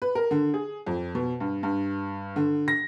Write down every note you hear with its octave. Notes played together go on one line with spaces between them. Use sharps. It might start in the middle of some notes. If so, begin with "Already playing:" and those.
B4
A#4
D3
G#4
F2
B2
G2
G2
D3
A#6